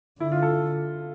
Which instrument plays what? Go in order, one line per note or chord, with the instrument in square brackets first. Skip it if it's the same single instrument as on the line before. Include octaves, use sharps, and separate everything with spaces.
[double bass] D3 [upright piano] E4
[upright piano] F4
A4